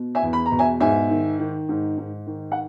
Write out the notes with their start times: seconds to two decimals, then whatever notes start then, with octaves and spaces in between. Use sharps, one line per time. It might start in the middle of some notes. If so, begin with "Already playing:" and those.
Already playing: B2
0.15 E5 G#5
0.23 E2
0.33 B5
0.46 A#5
0.51 B2
0.59 E5 G#5
0.81 G#2 E5 G#5
1.10 D#3
1.39 D#3
1.69 G#2
1.98 G#2
2.27 D#3
2.52 F#5